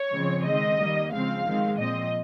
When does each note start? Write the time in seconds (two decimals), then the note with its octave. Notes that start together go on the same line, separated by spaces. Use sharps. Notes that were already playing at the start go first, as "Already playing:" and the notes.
Already playing: C#5
0.13 C#3 F3 G#3 C4
0.46 D#3 G#3 C4 D#5
0.79 D#3 G3 A#3
1.13 C#3 F3 G#3 C4 F5
1.46 D#3 G#3 C4
1.78 A#2 F3 C4 D#5